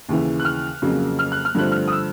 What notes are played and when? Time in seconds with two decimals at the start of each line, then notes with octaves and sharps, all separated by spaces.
0.09 D#2 C#3 E3
0.40 F#6
0.45 F6
0.82 F2 C#3 F#3 A#3
1.19 F6
1.32 F#6
1.45 F6
1.55 G2 D3 F3 A3 C4 F#6
1.72 F6
1.88 D#6
1.92 E6